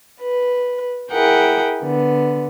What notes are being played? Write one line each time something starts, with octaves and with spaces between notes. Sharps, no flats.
B4
E4 G#4 A#4 F#5 G5
D3 B3